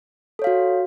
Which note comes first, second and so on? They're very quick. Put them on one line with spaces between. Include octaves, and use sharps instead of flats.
A4 C#5 F5 F#4